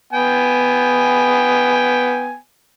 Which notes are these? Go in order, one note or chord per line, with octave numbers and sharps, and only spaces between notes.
B3 G5 G#5